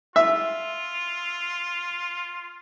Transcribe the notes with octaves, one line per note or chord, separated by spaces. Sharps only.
F4 E5